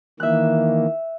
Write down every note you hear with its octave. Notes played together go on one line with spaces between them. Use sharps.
D#3 E3 A#3 E5 F#6